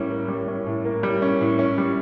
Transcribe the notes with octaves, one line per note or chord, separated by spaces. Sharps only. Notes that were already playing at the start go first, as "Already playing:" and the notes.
Already playing: A2 G3 A#3 C#4
A#3
G3
C#4
A2
A#3
G3
C#4
A2
C#4
G3